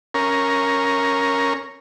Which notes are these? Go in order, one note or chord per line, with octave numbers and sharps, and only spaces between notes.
C#4 A#4